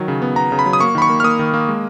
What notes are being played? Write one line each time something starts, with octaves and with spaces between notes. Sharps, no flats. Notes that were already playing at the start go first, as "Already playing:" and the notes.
Already playing: D#3 F#3
C#3
B3
B3 A#5
C#3
B5
F#3
D#6
A#3 C#6
D#3 B5
C#6
A#3
F6
A#3 D#6
D#3
A#3
G#3